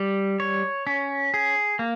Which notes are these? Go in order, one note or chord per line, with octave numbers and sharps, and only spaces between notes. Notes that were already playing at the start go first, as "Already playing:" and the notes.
Already playing: G3
C#5
C#4
G#4
A#3